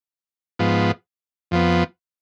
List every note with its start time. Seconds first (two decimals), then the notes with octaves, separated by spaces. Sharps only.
0.59 G#2 F3 B3
1.51 F2 F3 B3